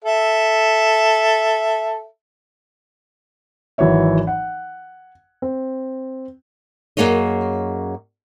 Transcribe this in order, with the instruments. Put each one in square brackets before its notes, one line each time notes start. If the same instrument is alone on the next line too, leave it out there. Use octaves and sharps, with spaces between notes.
[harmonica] A4 E5
[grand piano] G#1 E3 F#3 C#5 E5
F#5
C4
[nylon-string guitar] F#2 G3 A#3 G#4 C#5 D#5